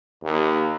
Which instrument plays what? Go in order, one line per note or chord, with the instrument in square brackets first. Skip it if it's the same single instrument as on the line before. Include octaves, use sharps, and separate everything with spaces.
[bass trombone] D#2